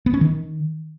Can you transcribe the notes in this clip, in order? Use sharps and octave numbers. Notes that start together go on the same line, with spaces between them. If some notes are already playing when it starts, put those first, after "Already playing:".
B3
C#4
D#3